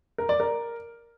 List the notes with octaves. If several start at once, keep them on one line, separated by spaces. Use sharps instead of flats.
A#4
D5
A#4